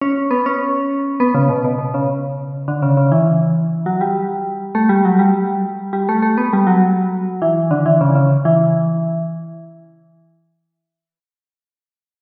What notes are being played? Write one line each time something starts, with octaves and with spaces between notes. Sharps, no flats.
C#4
B3
C#4
B3
C#3
B2
B2
B2
C#3
D3
C#3
C#3
E3
F#3
G3
A3
G3
F#3
G3
G3
A3
A3
B3
G3
F#3
E3
D3
E3
C#3
C#3
E3